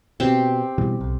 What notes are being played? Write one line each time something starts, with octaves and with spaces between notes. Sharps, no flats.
B2 C4 G4
B2 E3 G3
B1